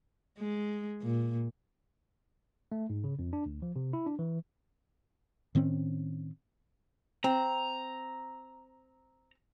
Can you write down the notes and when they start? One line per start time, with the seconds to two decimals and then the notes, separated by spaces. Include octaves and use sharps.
0.39 G#3
1.02 A#2
2.72 A3
2.90 G#2
3.04 C#3
3.19 F2
3.33 D4
3.46 D2
3.62 F3
3.76 C3
3.93 E4
4.07 D4
4.19 E3
5.55 A2 D#3 C4 C#4
7.24 C4 A#5